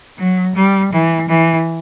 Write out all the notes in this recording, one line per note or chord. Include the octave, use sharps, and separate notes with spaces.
F#3
G3
E3
E3